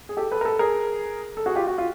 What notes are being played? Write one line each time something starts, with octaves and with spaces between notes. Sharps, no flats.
G#4
G4 A4
A4 B4
A#4
A4 B4
G#4 A#4
A4
F#4 G#4
F4 G4
F#4
F4